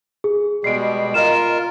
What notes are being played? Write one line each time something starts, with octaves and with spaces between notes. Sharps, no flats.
G#4
B2 G3 G#3 C7 D7
F4 A#4 D#5 E7